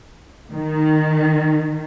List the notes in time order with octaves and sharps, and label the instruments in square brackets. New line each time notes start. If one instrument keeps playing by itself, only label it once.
[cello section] D#3